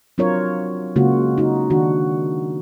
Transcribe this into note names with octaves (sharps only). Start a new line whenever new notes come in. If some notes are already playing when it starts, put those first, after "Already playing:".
F#3 C4 D4 F4 A#4 C#5
C#3 G#3 A#3 F4 F#4
D#4 F#4
D#3 D4 F#4